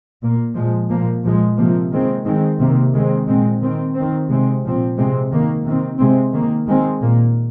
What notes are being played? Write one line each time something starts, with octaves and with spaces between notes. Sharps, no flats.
A#2 A#3
A#2 F3 G#3
A#2 F3 A#3
A#2 F3 G#3
C3 F3 A#3
D#3 G#3 C4
D#3 G#3 C4
C3 D#3 A#3
D#3 G#3 C4
A#2 G#3 C4
D#3 C4
D#3 C4
C3 G#3 C4
A#2 F3 C4
C3 G#3 C4
D#3 A#3
C3 D#3 C4
C3 G#3 C4
D#3 A#3
D#3 G#3 C4
A#2 A#3